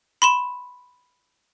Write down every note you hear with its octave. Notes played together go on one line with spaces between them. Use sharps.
B5 C6 E7